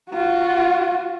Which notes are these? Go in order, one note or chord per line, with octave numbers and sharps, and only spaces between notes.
F4 F#4